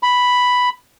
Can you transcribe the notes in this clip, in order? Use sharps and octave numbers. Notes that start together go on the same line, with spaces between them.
B5